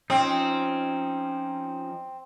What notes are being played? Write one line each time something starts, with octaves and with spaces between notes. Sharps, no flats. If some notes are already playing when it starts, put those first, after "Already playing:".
F3 C4 C#4 D#4